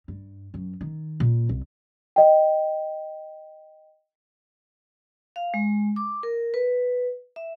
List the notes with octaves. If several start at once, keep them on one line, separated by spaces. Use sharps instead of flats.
G2
F#2
D#3
A#2
C2
D#5 G5
F5
G#3
D6
A#4
B4
E5